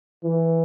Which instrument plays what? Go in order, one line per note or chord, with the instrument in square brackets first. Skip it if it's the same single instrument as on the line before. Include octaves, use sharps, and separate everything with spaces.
[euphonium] E3